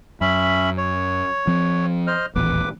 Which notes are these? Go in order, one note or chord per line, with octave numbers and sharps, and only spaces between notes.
F#2 C#4 E5 B5
C#5
F3 C4
C5 D#5 F6
D#1 A1 E2 B4 D6